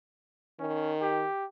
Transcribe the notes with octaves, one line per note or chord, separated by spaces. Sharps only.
D#3 C#4
G4